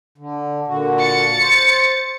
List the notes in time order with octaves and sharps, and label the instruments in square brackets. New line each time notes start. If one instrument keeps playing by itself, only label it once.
[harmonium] D3
A#2 D3 F#4
[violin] A6 C#7
[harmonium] C5